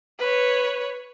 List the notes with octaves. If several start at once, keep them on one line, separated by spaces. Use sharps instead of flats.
B4 C#5